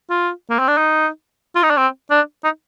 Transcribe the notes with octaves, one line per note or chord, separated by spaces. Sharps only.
F4
A#3
C4
D4
D#4
F4
D#4
D4
C4
D4
D#4